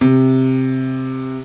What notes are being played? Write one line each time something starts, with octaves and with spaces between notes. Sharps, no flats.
C3